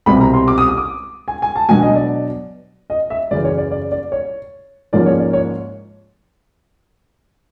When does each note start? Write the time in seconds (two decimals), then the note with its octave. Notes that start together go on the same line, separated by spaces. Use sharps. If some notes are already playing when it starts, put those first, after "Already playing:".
0.06 C2 B2 G3 C4 B5
0.20 A#5
0.34 C6
0.48 D6
0.58 D#6
0.68 D#6
0.77 D6
1.28 G#5
1.42 G#5
1.55 A5
1.69 B2 F#3 B3 D4 G#5
1.82 D#5
1.96 D5
2.90 D#5
3.10 E5
3.31 F#2 C#3 E3 D5
3.45 C#5
3.58 D5
3.71 D5
3.92 D5
4.12 C#5
4.93 G#2 F3 A#3 C#4 D5
5.06 C#5
5.20 D5
5.33 C#5